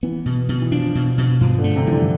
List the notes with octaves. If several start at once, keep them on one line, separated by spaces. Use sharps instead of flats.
E3 B3
B2
B2
E3
F3 D4
B2
B2
G2 F3
D3
A3
C3
E3 F3
D3